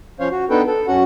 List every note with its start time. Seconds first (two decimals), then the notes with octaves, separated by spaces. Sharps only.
0.20 F3 C#4 C5 C#5 F5
0.31 F#4
0.50 B3 D4 D#4 A4 B4 G5
0.67 A4
0.87 F#2 C#4 F#4 F#5